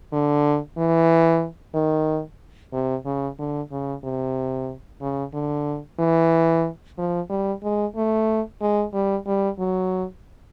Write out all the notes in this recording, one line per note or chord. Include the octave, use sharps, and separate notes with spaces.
D3
E3
D#3
C3
C#3
D3
C#3
C3
C#3
D3
E3
F3
G3
G#3
A3
G#3
G3
G3
F#3